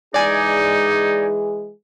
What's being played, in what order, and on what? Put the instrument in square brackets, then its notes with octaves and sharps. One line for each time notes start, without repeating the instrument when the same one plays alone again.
[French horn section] E3 G#3 G#4 [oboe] D#4 [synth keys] D5 G#5